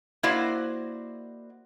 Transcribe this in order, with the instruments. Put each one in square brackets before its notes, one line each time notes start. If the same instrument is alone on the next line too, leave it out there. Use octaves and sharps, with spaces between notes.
[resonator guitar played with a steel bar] A#3 E4 F#4 C5 D5 D#5